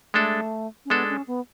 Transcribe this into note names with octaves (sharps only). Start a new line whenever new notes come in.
G#3 A3 D4 A4
C#4
G#3 B3 D4 A4
C#4
B3